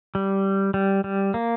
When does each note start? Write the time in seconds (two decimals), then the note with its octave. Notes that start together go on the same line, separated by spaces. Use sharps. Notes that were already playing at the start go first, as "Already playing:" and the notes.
0.15 G3
0.74 G3
1.04 G3
1.34 A#3